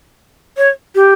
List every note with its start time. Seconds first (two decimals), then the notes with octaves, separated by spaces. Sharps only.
0.57 C#5
0.95 G4